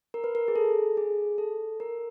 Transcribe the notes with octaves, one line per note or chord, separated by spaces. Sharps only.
A#4
B4
A#4
G#4
A4
G#4
A4
A#4